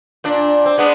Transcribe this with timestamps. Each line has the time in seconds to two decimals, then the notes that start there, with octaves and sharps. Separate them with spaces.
0.24 A#2 D4
0.65 C4
0.78 G#3 B3 D4